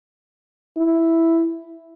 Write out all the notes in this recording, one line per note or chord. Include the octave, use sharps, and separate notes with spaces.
E4